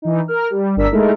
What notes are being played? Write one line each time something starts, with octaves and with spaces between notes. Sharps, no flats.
E3 D#4
A#4 F6
G3
G1 D4 A#4 D5 E6 B6
G#3 A3 D#4 E4 A4 A#4